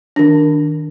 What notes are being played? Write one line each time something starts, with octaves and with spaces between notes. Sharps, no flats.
D#3 D4